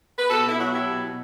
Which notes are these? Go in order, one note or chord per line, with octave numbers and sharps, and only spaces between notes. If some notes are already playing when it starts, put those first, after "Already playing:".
B4
B2 F#4 A4
B2 E4
F#3 F#4
F#3 E4 G4
B2
B2